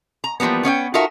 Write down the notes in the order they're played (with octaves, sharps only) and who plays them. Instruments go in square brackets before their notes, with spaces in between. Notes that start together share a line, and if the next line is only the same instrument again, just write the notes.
[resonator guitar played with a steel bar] A#5
E3 F3 G3 A#3 B3
B3 C#4 D5 G5
D#4 F4 F#4 A4 A#4 E5